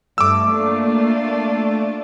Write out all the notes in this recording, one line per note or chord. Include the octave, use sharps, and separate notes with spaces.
G2 A3 D6 E6
A#3 D4 F4